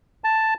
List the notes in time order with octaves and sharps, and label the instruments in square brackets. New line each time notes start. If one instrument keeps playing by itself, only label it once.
[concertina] A5